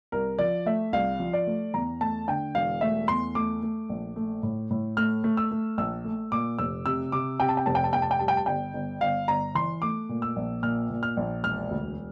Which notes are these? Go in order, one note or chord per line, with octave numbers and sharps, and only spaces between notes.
C2 A#4
F3 D5
A3 E5
C2 F5
F3
D5
A3
E2 A#5
A3 A5
D3 G5
E1 F5
A3 E5
E2 C6
A3 D6
A3
A#1
A3
A2
A2
A3 F6
A3
E6
A3
A#1 E6
A3
A#2 D6
F1 E6
C3 E6
C3 D6
C3 G5
A5
G5
F1 A5
G5
A5
F1 G5
A5
G5
G3 A5
G5
A5
G1 G5
G1
G1 F5
G1 A#5
E3 C6
A3 D6
A#2
E6
A#1
A#2 F6
A#2
F6
A#1
E1 F6
D2